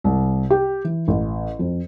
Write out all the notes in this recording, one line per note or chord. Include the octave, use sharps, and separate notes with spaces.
C2
G4
E3
A1
F2